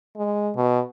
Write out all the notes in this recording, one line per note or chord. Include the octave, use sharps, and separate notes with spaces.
G#3
B2